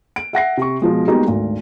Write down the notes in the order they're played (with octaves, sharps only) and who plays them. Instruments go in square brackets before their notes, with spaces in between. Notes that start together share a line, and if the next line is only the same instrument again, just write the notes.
[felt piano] D7
E5 F#5 A#6 C7
C3 C#6
B2 F3 G#3
G3 G#3 A#3 B3 D#4 F#4
G#1 D2